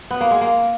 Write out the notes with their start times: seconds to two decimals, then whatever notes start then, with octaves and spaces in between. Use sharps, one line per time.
0.11 B3
0.21 A#3
0.31 G#3
0.41 A#3